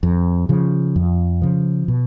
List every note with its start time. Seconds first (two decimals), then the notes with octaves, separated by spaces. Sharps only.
0.03 F2
0.49 C#3 F3
0.96 F2
1.42 C#3 F3
1.88 B2